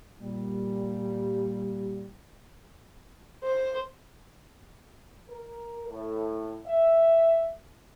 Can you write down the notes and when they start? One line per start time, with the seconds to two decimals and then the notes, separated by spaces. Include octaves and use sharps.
0.22 A#2 G3
3.44 C5
5.29 A#4
5.88 A2
6.67 E5